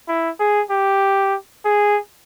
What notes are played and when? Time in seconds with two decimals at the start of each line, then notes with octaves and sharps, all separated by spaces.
0.08 E4
0.40 G#4
0.70 G4
1.65 G#4